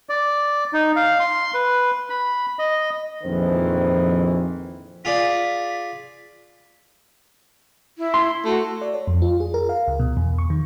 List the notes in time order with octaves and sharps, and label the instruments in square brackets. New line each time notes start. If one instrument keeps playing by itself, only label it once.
[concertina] D5
D#4
F5
C6
B4
B5
D#5
[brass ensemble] A#1 F2 D#3 E3 C5
[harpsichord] F4 G#4 D5 [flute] B6
[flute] E4
[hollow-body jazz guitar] C6
[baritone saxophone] A3 [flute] F#4
[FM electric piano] D5
C#5
F2
F4
G#4
A#4
F5
C#2
B2
E2
C#6
D#3